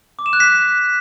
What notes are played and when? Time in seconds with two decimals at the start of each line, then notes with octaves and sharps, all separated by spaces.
0.19 D6
0.26 E7
0.33 F#6
0.40 B6